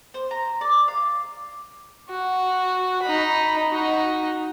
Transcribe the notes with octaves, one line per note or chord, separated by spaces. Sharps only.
C5
A#5
D5
F5
F#4
D#4 B5
D#4 F#4